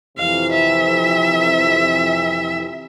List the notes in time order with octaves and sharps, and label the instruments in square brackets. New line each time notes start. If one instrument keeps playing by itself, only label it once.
[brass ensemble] F2 C3 E3 [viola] F5
[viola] E5